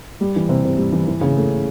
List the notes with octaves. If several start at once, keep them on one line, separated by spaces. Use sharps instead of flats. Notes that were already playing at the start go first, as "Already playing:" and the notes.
G3
E3
C3
C3
G3
E3
E3
C#3
A3